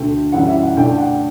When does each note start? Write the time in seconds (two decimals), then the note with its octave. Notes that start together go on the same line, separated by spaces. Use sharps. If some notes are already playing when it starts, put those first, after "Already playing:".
Already playing: D2 D3 A3 G5
0.32 F#2 E3 G3 F#5
0.47 E5
0.63 F#5
0.76 G2 D3 A3 D4 G5
0.98 F#5